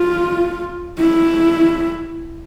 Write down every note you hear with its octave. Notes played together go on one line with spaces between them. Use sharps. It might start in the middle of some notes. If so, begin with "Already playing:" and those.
Already playing: F4
E4